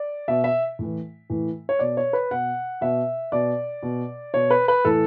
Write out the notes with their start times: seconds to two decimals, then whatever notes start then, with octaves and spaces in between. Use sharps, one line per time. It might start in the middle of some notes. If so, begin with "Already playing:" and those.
Already playing: D5
0.28 B2 E5
0.44 E5
0.79 A2 E3
1.30 A2 E3
1.69 C#5
1.79 B2 D5
1.97 C#5
2.13 B4
2.31 B2 F#5
2.81 B2 E5
3.32 B2 D5
3.83 B2
4.34 B2 C#5
4.50 B4
4.68 B4
4.85 A2 E3 A4